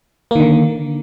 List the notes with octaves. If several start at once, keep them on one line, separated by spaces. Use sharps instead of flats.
D3 D#3 A#3